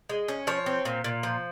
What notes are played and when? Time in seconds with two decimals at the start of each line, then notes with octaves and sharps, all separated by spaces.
0.09 G#3
0.28 C#4
0.47 F3 C#5
0.66 C4
0.85 A#2
1.04 A#2
1.23 F3